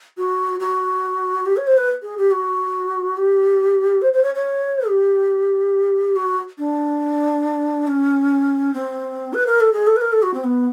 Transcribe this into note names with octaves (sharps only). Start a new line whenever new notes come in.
F#4
F#4
G4
C#5
C5
B4
G#4
G4
F#4
G4
C5
C5
C#5
C#5
G4
F#4
D4
C#4
C4
B4
A#4
A4
G#4
A4
B4
A#4
A4
F#4
C4
B3